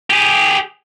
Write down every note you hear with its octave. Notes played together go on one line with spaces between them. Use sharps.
G4 G#4